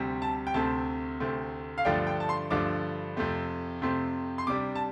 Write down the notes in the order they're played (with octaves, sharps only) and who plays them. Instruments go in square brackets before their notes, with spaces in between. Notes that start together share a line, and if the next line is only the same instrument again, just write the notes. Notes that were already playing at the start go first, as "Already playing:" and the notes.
Already playing: [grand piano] D2 C3 G3 C4
A5
G5
D2 C3 A3 C4 A5
D2 C3 A3 C4
F5
G2 D3 F3 A3 D4 G5
G5
A5
C6
G2 D3 F3 A3 D4 D6
F2 C3 A3 C4
F2 C3 A3 C4
C6
C3 G3 D4 D6
A5